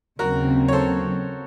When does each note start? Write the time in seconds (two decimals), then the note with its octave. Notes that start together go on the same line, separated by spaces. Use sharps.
0.19 D#2 C#3 F#3 C4 F#4 A#4
0.68 C#5
0.73 A4 C5